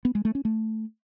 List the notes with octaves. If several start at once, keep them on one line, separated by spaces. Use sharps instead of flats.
B3
G#3
A3
C#4
A3